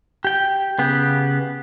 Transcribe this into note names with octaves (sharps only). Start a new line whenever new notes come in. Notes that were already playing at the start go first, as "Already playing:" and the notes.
G4 G5
C#3 B3 G4